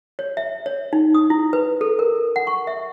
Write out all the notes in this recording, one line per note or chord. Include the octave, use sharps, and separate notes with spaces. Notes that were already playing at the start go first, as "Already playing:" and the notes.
C#5
E5
C#5
D#4
D#6
E4
B4
A4
A#4
F#5
C#6
E5